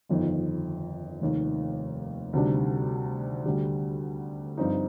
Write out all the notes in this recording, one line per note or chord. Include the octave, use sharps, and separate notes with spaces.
G1 F2 D#3
F1 D#2 D#3
D2 C3 D#3 G3 D4
D2 D3 G3
G2 F3 C4 D#4